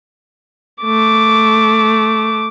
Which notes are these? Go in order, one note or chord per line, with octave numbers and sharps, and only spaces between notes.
A3 D6